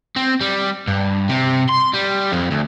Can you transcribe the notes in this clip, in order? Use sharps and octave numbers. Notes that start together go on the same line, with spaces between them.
C4
G3
G2
C3
C6
G3
F2
D2